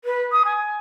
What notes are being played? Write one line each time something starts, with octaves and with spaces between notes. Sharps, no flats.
B4
D#6
G#5